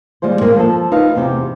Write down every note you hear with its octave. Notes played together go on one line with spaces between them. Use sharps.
D#2 G3 G#3 F4 C5
G#3 A#3 C4 F4 G#4
F3 A4
D#4 F4 B4 F5
E2 C3 G4